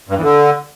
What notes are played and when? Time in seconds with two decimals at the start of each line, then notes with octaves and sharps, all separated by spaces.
0.09 G2
0.16 E2
0.23 D3